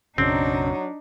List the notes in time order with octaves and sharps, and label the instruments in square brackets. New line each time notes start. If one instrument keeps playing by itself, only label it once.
[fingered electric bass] B1 F#2 C#3 [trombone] F#3 [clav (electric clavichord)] C4 [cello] D4 D#4